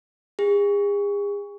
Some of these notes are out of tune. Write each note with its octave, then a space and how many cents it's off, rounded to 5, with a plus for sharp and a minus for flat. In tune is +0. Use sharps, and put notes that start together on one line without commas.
G#4 -40